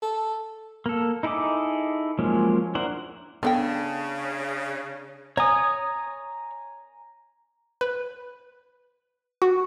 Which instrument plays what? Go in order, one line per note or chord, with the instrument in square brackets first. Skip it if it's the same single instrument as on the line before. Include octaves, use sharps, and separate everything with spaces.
[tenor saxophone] A4
[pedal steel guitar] A#3 A4
D#4 E4 G#4 A4 D6
F3 F#3 G#3 A#3 C#4
D4 E4 A#4 C5 F#5
[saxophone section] C#3 [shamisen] B3 A4 G5 [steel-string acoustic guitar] D4
[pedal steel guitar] C#5 D#6 [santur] G#5 A#5
[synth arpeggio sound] B4
F#4